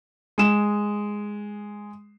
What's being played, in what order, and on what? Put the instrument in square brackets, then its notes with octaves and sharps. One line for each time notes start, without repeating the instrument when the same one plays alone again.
[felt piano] G#3 E7